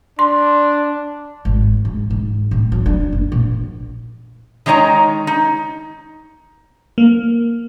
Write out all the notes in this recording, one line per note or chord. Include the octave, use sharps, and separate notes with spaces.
D4 C6
G#1
G#2
G#2
A2
F#3
D4
F#1
A#1
D#3 G#3 D#4 C#5 A#5
D#4
A#3